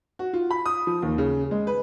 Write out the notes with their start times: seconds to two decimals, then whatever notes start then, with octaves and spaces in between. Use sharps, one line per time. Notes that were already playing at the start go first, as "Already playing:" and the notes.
0.19 F#4
0.33 F4
0.51 B5
0.66 D#6
0.87 F3
1.02 D#2
1.18 C#3
1.51 G#3
1.67 B4